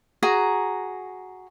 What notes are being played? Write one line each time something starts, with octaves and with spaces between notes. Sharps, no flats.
F#4 G#4 A#5